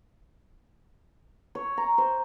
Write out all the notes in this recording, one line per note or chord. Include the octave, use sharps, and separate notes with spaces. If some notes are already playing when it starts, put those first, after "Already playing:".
C#5
A#5
C5